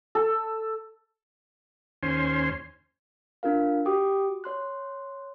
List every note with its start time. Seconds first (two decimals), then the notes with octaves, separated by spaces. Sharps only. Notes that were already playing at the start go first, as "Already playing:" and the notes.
0.15 A4
2.03 D#2 C#4 C5 G#5 C6
3.43 D4 F4 A#4 F5
3.85 F#4 G4 G5 D6 D#6
4.44 C#5 C6 F#6